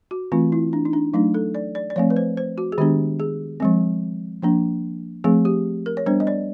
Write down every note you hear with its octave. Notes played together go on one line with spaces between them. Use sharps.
F#4
E3 A3 C4 F4
E4
D4
D#4
D4
F#3 A3 D4 D#4
A4
D5
D5
D5
F3 A3 C4 C#5
B4
C5
C5
F#4
G#4
D#3 G#3 B3 D4 G4
G#4
F3 G#3 C4
F3 A#3 D4
F3 A3 C4 G#4
G4
A#4
C#5
G3 B3 D4 C5
D#5
D5